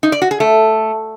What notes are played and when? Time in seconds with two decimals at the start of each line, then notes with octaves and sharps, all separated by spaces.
0.03 D#4
0.12 D5
0.22 F#4
0.31 G#4
0.40 A3